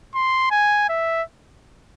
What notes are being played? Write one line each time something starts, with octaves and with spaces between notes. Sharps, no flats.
C6
G#5
E5